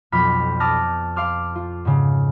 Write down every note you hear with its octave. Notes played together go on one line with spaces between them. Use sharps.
B1 F2 B5 D6 F6 B6
A5 D6 D#6 F6 A#6
F5 C6 D6 F6
F4
G#2 C#3